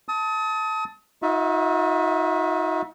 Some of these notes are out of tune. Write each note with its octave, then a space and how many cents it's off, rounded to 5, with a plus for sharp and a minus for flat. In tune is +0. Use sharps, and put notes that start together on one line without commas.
A5 +0 D#6 +35
D#4 +35 F#4 -40 E5 +0